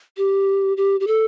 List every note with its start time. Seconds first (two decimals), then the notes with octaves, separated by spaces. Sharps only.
0.17 G4
0.77 G4
1.00 G4
1.07 A4